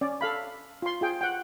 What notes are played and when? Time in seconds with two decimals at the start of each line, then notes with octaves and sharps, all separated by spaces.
0.01 C#4 D5
0.21 A4 F5 B5
0.82 F4 C6
1.01 F4 G#4 G5
1.21 F#5 G5